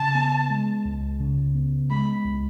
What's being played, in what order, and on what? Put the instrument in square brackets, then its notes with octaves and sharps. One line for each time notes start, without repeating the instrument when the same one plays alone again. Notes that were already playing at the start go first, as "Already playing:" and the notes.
Already playing: [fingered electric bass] C#3 [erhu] A5
[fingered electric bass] B3
G#3
C#2
C#3
B3
[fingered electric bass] G#3 [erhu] B5
[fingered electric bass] C#2